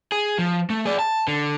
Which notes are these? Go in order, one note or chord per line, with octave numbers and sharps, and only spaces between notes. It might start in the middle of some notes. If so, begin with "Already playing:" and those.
G#4
F3
A3
G#4 D5
A5
D3